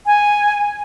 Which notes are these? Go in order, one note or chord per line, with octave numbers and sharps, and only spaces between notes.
G#5